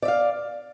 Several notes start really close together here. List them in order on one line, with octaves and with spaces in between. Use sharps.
D5 E5 F5